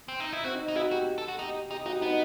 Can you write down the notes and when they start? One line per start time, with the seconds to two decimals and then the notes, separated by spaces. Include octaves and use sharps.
0.08 C4
0.20 D#4
0.33 E4
0.44 C4 F#4
0.55 D#4
0.68 D#4
0.76 E4 F#4
0.91 F#4 G4
1.18 A4
1.28 F#4
1.38 D#4 G4
1.70 D#4 G4
1.82 G4
1.86 D#4 F#4
2.01 B3 D#4